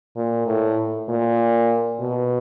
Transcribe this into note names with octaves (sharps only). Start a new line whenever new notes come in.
A#2
A2
A#2
B2